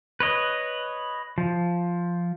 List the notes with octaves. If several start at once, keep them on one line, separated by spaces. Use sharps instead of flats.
B4 C#5 D#5
F3